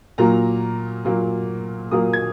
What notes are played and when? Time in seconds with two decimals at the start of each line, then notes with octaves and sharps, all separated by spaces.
0.18 A#2 F#3 A#3 A#5
1.05 A#2 F#3 A#3
1.91 A#2 F#3 A#3 D#6
2.13 G#6